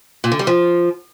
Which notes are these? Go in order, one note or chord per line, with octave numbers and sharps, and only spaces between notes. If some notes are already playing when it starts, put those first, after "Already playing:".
A#2
D3
G3
F3